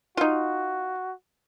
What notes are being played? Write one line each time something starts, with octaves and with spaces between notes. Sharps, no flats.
D#4 F4 F#4